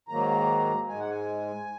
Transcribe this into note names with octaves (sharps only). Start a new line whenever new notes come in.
G#2 D#3 F#3 A#3 A#5
G#2 G#3 G#5
F#5
G#5